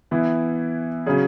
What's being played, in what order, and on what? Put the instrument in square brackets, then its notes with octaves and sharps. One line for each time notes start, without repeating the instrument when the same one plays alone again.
[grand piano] E3 B3 E4
C#3 F#3 C#4 G#4